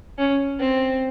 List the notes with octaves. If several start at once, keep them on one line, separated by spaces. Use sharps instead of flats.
C#4
C4